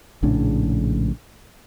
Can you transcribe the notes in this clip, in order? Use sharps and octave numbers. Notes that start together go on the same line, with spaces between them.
A#1 A2 C#3 D4